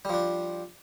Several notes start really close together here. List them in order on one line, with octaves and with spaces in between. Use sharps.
G3 F3 D4